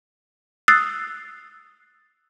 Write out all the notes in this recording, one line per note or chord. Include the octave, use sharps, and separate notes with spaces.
D#6 E6 F#6 A6 C7